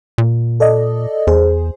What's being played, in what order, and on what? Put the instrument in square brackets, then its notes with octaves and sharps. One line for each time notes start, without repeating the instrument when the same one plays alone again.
[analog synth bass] A#2
[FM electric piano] A4 D5 D#5
[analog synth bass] E2 [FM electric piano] G#4 C5